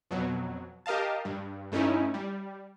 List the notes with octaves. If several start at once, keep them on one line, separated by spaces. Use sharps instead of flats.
F2 B2 F#3
G4 A#4 D#5 F5 A5
G2
G2 A3 C#4 D#4 E4
G3